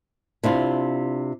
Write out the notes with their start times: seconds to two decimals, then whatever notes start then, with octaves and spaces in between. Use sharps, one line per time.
0.44 C3 D4 E4 F4